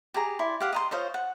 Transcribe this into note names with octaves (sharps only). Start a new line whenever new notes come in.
G4 G#4 A#5
E4 D5 C6
G4 F5 F#5
D#5 A#5 C6
F4 C5 C#5 D#5
F#5